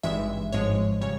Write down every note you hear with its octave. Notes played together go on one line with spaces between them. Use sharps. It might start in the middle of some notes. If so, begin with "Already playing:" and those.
G#1 G2 E3 G#3 E5
G#1 G#2 F3 G#3 C#5
C#3 G3 C#5